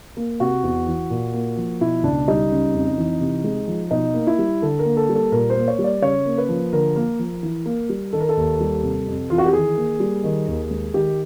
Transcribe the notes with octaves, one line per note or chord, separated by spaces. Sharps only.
A#3
C3 F#4
E2
E3
A#2
A#3
F3
B2 E4
C#2 D4
G3 D#4
C#3
F2
E3
C3
G#3
F3
B2 D#4
A#3
E4
G3
D3 A4
A#4
A#3
A4
G3
A4
A#2 A#4
C5
A#3
C#5
G3
D5
C#3 C#5
A#3
B4
F3
D3 A#4
A#3
F3
E3
A#3
G3
D#3 A4
A#4
A4
D#2
G3
C3
F2
E3 F4
F#4
G4
D#3 G#4
A#3
G3
D#3
D#2
G#3
D#3 G4